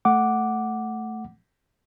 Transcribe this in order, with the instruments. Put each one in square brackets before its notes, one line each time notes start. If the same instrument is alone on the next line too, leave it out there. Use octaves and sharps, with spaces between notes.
[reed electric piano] A3 F#5 D6